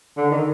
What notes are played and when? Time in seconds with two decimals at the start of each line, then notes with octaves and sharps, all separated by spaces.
0.17 D3
0.31 D#3